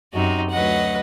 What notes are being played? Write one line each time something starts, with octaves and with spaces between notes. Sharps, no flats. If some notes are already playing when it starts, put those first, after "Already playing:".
F#2 C3 D#4 F#4
D2 F#3 B4 D#5 F#5